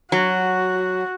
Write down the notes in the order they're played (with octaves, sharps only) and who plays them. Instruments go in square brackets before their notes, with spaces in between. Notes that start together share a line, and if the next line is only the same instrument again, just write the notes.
[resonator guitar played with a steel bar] F#3 [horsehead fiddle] F#4